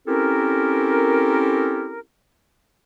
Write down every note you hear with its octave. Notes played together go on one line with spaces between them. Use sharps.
C4 C#4 E4 G4 A4 A#4